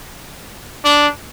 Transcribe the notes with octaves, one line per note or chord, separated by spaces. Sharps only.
D4